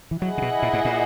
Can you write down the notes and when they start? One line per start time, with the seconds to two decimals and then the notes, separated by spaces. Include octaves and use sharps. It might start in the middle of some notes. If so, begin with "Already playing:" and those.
0.11 E3
0.22 F#3 E4 G#4 D#5 F#5
0.38 C#3
0.42 B2
0.62 A#2
0.73 G#2
0.85 A#2